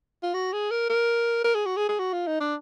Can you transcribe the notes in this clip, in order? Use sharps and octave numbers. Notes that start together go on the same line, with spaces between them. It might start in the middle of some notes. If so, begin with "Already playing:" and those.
F4
F#4
G#4
A#4
A#4
A#4
G#4
F#4
G#4
G#4
F#4
F4
D#4
D4